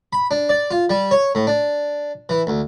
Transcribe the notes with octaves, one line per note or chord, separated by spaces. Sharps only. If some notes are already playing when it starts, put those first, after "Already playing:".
B5
D4
D5
F4
G3
C#5
A2
D4
E3
D2